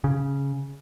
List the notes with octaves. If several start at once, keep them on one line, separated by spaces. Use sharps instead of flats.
C#3